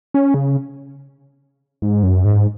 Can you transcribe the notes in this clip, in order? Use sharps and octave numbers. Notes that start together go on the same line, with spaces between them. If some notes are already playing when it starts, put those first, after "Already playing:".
C#4
C#3
G#2
F#2
G#2